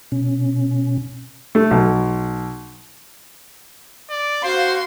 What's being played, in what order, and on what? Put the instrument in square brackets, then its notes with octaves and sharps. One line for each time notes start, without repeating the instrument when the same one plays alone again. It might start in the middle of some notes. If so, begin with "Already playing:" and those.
[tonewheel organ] B2 C#4
[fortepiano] A3
B1
[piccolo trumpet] D5
[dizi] F#4 [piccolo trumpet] C5 [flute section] F5 [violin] C6